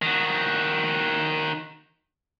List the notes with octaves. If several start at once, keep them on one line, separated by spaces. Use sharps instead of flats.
D#3 F#4